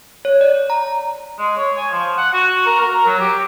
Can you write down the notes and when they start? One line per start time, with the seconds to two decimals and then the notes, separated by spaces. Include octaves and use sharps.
0.25 C#5
0.41 D5
0.70 A#5
1.38 G#3
1.57 C#5
1.77 G#5
1.91 F3
2.17 F#5
2.33 F#4
2.66 A#4
2.81 A#4
3.06 F#3
3.20 G4